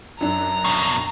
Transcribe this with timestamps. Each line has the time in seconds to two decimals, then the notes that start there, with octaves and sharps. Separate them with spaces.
0.21 F#2 D4 A#5
0.65 F2 B2